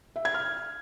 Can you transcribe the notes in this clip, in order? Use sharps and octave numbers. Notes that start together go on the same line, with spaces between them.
E5
G#6
F6